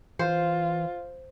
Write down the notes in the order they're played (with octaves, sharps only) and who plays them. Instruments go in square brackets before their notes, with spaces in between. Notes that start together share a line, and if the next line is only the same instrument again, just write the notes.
[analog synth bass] E3 [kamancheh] F4 [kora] C5